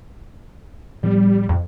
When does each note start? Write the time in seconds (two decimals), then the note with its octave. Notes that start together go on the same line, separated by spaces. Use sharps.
1.03 A2 F3 G3 B3
1.49 F2